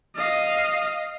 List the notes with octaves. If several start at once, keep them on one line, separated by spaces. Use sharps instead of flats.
D#5 F5